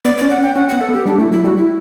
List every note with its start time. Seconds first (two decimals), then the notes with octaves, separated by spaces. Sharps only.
0.05 B3 D5
0.17 D5
0.22 C#4
0.30 F#5
0.38 C#4
0.43 G5
0.56 C#4 F#5
0.69 B3 F#5
0.81 A4
0.89 B3
0.93 G4
1.06 G3 D4
1.18 A3 E4
1.31 F#3 E4
1.45 G3 F#4
1.57 E4